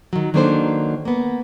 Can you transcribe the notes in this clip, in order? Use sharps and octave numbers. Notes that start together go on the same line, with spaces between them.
D#3 F#3
D#3 F#3 A#3 D4 A4 C5
A#3 B3